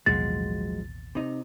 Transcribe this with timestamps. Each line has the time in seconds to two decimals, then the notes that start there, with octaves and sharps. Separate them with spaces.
0.06 A1 D#2 B2 F3 F#3 G#3 A6
1.15 C3 D#4